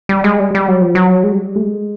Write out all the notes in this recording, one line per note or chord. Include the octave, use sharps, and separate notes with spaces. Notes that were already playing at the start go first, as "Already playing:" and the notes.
G3
G#3
G3
G3
F#3
F3
F#3
G#3
G3
A3
G#3